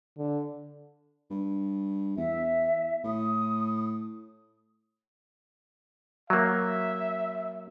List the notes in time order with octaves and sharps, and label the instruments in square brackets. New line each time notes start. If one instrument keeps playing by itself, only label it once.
[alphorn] D3
[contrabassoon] G2
[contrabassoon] E2 [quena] E5
[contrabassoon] A2 [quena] D#6
[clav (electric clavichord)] F#3 A#3 [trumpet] E5